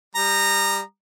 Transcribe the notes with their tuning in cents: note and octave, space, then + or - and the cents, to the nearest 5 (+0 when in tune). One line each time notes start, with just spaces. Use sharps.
G3 +10 A#5 -10 D#6 -40